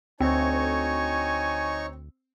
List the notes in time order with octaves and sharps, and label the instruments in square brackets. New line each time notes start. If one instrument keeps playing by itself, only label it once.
[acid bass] D2 [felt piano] C4 [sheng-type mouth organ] D#4 C#5 C#6 [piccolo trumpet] G#5